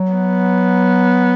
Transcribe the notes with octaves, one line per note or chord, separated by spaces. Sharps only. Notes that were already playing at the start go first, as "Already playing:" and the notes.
Already playing: F#3
B3